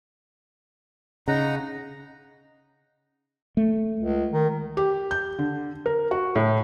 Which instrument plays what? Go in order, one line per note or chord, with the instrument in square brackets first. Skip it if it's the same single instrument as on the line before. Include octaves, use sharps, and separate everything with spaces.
[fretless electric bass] C#3 [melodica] D#4 F#5 A#5
[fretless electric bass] A3
[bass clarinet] C#2
D#3
[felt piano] G4
G6
D3
A#4
F#4
A2